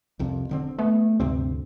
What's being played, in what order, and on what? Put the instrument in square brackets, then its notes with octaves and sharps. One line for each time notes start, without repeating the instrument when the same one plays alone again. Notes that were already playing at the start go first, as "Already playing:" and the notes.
[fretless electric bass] C2 F2 C3
E1 D3 C4
[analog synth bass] A3 [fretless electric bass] B3
[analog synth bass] D2 [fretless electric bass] G2 C3 C4